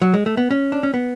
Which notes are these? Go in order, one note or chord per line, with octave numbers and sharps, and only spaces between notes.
F#3
G#3
A3
B3
C#4
D4
C#4
B3